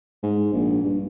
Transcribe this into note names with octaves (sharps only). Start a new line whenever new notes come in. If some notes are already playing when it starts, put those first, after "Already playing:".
G#2
A#1
G2